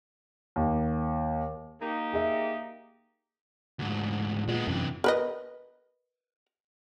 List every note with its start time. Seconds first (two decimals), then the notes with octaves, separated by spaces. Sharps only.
0.56 D#2
1.81 A#3 D#4 G4
2.13 G#4 E5
3.79 D2 G#2
4.48 A#2 G#3 B3
4.67 F#2 C3 E3
5.04 A#4 B4 D#5